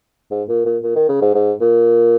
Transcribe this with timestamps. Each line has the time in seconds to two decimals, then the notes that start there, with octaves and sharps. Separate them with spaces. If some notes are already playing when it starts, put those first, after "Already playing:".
0.31 G#2
0.49 A#2
0.66 A#2
0.83 A#2
0.96 D#3
1.09 C#3
1.22 G#2
1.35 G#2
1.60 A#2